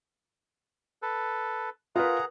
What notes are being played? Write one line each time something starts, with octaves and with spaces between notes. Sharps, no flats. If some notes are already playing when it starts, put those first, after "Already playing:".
A4 B4
F4 G#4 A#4 B4 F#5 A#5